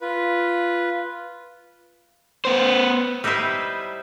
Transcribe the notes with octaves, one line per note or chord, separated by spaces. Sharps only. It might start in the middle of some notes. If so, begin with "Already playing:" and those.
F4 B4
B3 C5
G3 D#4 E4 B4 C5 E5